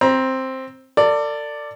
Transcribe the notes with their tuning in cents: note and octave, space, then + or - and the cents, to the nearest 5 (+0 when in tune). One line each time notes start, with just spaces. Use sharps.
C4 +5 A#5 +35
A4 +40 D5 +0